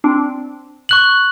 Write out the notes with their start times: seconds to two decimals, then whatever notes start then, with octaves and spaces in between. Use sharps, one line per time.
0.04 C4 D4
0.89 C#6 F#6 F#7